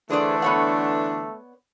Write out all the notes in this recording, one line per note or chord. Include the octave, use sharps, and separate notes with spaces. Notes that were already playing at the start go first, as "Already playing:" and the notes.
D3 E3 A3 D4 G#4 C5 D5
B3 C#5 F#5